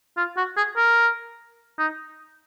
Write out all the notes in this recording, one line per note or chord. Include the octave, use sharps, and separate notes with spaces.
F4
F#4
G#4
A#4
D#4